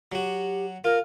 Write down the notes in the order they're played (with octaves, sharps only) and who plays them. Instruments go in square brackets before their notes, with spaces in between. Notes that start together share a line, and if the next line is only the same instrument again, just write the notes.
[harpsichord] F#3 F#4 [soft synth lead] G4
[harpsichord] F4 [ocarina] A#4 [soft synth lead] F6